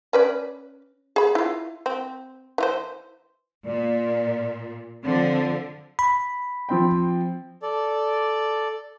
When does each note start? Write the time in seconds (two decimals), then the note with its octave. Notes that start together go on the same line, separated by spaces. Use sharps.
0.13 C#4 B4 D5
1.16 G#4 B5
1.35 E4 F4
1.86 C4
2.58 E3 F4 C5
3.66 A#2 D5
5.04 D3 F3 C4
5.99 B5
6.69 F3 C4 G5
7.63 A4 D5